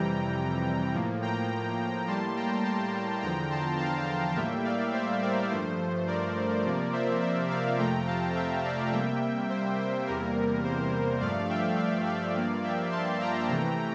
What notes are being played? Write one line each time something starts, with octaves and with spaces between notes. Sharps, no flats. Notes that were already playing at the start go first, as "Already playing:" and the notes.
Already playing: F2 C3 E3 G3 G5 A#5
A2 F3 A#3
G5 A#5
A2 G3 A#3 A5 C6
G5 A#5
A5 C6
E2 D3 F3 G5 A#5
A5 C6
F5 A5
A2 G3 A#3 E5 G5
D5 F5
C5 E5
A#4 D5
G2 F3 A3 C5
A#4 D5
C3 F3 A#3
C5 E5
C5 E5
D5 F5
F2 C3 F3 A3 G5 A#5
F5 A5
E5 G5
D5 F5
C3 G3 A#3 E5 G5
C5
C5
E2 C3 G3 A#3 A#4
C5
G2 F3 A3 D5 F5
E5 G5
D5 F5
D5 F5
G2 F3 A#3
E5 G5
A5 C6
G5 A#5
C3 E3 A3